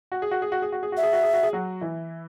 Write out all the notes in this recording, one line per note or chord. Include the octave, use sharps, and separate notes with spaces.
F#4
G#4
F#4
G#4
F#4
G#4
F#4
G#4
F#4 E5
G#4
F#4
G#4
F#4
G#4
F#3 F#4
E3 E4